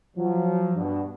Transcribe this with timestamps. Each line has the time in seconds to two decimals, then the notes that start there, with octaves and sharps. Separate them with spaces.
0.17 F3 F#3
0.76 G2 B2 D4